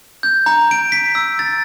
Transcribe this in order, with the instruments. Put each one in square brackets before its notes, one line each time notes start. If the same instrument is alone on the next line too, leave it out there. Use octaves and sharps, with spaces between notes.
[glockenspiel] G6
A#5
D7
B6
E6
A6